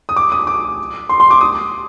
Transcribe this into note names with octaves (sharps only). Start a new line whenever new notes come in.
D#6
D6
D#6
D6
C6
C6
D6
D#6